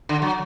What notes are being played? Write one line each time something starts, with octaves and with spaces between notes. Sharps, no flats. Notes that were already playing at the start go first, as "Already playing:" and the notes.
D3
F#3